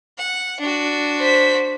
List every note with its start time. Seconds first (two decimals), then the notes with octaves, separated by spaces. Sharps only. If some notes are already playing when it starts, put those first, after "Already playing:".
0.18 F#5
0.60 D4 F#4
1.18 C5 B6